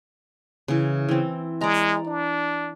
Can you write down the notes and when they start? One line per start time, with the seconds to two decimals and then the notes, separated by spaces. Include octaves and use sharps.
0.68 C#3 E3
1.09 E3 C4
1.61 G#3 D5 A#5
2.07 D4